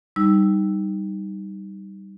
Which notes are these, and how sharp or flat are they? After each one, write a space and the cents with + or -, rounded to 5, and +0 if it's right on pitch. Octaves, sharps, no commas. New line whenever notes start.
G3 -10 D#4 +0 E6 +0